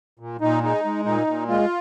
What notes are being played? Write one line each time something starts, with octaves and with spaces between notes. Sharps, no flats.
A#2
A#2 D#4
G#3 D#4
G#3
A#2 D#4
A#2
G#3 F4